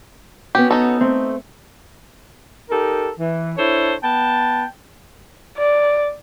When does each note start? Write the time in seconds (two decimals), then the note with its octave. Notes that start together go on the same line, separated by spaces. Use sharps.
0.55 B3 C#4 F#4 G4
0.71 D#4 A4
1.01 A3 C4
2.70 D#4 G4 A4 A#4
3.19 E3
3.57 D4 E4 A4 C5 C#5
4.02 B3 G5 A5
5.58 D5